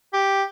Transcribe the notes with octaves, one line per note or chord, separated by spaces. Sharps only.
G4